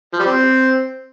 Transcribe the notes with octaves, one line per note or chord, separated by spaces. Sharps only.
F3
G3
C4